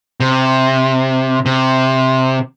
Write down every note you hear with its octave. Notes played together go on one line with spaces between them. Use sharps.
C3
C3